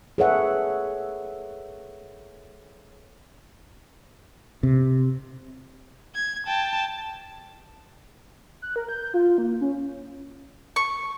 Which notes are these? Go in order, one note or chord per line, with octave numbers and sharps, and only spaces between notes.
G#4 A4 B4 C#5 E5 F#5
C3
G#6
G5 A5
F#6
A#4
G6
F4
A#3
C#4
C#6